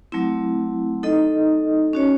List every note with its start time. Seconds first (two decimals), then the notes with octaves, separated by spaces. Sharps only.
0.12 F#3 A3 C4 E4
1.03 D#4 A4 D#5
1.93 C#4 F#4 C#5